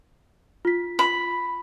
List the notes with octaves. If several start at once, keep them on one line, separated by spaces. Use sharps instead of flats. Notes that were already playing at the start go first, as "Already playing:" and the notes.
F4 B6
B5